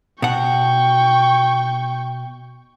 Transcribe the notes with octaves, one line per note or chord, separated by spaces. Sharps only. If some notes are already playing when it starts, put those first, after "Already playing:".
B2 F#5 G5 C#6